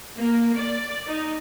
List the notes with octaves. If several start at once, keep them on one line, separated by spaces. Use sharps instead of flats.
A#3
D5
D#4